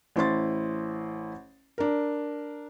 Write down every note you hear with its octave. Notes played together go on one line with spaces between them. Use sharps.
A1 E4 C5 C6 A6
D4 A#4